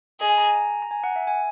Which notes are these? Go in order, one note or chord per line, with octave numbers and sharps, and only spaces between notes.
G#4 D#5
G#5
A#5
G#5
A#5
A#5
G#5
F#5
E5
G#5